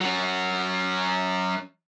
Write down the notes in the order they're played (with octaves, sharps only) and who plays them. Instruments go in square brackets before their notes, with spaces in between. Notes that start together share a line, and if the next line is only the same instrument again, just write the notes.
[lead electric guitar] F#3 C#4